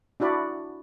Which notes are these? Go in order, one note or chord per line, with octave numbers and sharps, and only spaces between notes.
D4 E4 F#4 D5 B5